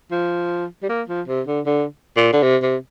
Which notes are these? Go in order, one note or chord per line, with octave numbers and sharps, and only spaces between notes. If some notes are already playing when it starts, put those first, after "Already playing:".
F3
G3
A#3
F3
C3
D3
D3
A#2
D3
C3
C3